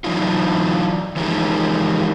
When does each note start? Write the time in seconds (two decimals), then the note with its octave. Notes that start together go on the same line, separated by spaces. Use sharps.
0.04 E3 F#3 D4 D#4 F4
1.16 E3 F3 G#3 D#4 G4 A#4